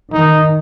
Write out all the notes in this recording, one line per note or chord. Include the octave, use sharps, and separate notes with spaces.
D#3 D#4